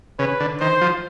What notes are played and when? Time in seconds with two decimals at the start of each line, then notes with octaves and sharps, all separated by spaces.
0.19 C#3 B4
0.40 D3
0.60 D#3 C5
0.81 F3